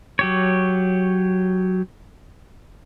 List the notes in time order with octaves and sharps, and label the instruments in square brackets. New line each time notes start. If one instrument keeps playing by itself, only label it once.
[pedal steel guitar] F#3 G4 C#5